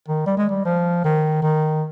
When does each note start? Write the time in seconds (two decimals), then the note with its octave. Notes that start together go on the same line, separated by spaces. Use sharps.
0.08 D#3
0.26 G3
0.37 G#3
0.49 G3
0.65 F3
1.05 D#3
1.42 D#3